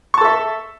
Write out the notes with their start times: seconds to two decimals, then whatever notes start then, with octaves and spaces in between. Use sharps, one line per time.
0.14 C#6
0.18 A5
0.21 A4
0.25 E5